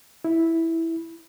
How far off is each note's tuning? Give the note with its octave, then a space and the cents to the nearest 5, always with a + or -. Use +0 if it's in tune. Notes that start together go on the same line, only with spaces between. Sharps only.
E4 -5